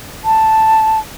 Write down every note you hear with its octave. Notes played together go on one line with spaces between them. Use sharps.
A5